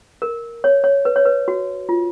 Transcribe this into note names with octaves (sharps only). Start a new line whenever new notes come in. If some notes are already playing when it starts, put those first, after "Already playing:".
A#4
C#5
C#5
B4
C#5
B4
F#4
F4